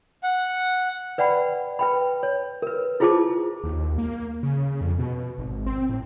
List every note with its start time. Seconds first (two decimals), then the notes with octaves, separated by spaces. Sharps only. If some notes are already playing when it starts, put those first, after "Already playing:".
0.23 F#5
1.18 B4 D5 F#5 G5 B5
1.79 B4 G5 B5
2.23 C#5
2.62 A#4 B4
3.00 E4 F4 G#4 C5 A5 D6
3.64 D#2
3.98 A#3
4.43 C#3
4.81 F2
4.99 B2
5.38 G#1
5.66 C4
5.89 A2